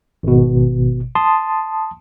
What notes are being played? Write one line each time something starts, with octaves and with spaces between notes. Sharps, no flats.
G#1 B2
A5 C6 D#6